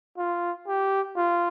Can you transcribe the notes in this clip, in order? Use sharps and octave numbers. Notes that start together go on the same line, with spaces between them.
F4
G4
F4